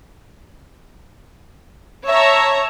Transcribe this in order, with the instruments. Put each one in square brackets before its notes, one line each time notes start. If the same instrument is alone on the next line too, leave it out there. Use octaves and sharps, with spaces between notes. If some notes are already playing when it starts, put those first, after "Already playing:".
[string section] C#5 E5 A5 A#5